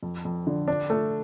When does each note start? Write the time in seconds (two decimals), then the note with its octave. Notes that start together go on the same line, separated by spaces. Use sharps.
0.03 F2
0.25 F2
0.47 D3
0.68 D4
0.90 A3